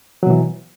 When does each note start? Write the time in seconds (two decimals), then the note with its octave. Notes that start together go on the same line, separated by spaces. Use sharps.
0.23 F#3
0.26 B2
0.30 E3